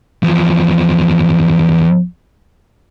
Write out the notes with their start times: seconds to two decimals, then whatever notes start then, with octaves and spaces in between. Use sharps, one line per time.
0.23 E2 F3